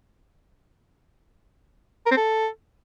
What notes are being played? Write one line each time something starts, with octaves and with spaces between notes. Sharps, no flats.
A#4
C4
A4